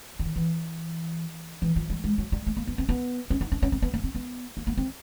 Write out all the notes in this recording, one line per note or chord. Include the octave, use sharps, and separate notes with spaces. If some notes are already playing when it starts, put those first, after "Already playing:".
D3
D#3
E3
E3
F3
G3
G#3
F#3
G3
A3
A#3
B3
C4
B3
C#4
D#4
D4
C#4
C4
B3
A#3
C4
B3
A#3
A#3
C4